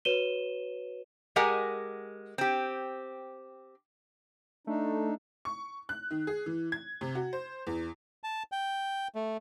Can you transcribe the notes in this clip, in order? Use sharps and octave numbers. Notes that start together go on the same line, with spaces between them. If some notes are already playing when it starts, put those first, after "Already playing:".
F#4 B4 C#5 D#7 E7 G7
G#3 G4 A#4 F#5 G#5
C4 G4
A3 D4 D#4
C#6
F#6
D#3
G#4
E3
G#6
C3
F#4
C5
E2
A5
G5
A3